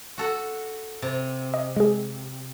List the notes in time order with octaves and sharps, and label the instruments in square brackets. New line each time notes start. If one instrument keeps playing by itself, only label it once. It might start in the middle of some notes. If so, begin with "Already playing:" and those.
[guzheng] F#4 A4 F#5
C3
[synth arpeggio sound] D#5
G#3 G#4